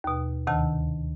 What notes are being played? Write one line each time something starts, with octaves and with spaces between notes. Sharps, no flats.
D#2 B2
D2 C3 D#3 A5